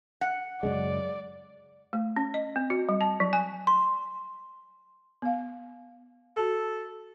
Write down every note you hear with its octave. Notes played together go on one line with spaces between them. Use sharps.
F#5
F#2 C#3 G#3 D5
A3
C#4
D#5
C4
F#4
G3
A5
F#3
G#5
C6
B3 F5
F#4 A4 A5